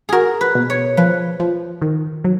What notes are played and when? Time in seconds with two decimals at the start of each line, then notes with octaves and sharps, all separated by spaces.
0.09 F#4 G#4 A#4
0.41 B4
0.55 B2
0.70 C#5
0.97 F3 B4
1.40 F3
1.82 D#3
2.24 F#3